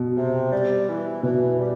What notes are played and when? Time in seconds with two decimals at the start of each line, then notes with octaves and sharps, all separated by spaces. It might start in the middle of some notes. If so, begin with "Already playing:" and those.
Already playing: B2
0.17 C3
0.52 G3
0.88 E3
1.23 B2 E3
1.59 G3